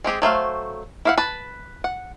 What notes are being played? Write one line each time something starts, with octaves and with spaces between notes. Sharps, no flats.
G#3 C4 G4 G#4
F#3 A3 C5 F5
E4 F5 F#5
B4 A5
F#5